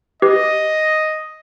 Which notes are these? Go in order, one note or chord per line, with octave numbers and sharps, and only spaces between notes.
G4 B4 D#5